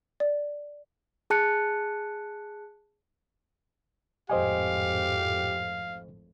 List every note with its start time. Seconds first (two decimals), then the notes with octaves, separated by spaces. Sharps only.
0.20 D5
1.30 G#4 A5 F#6 C#7
4.30 G#1 F2 A2 G4 C5 D#5 F5 G#5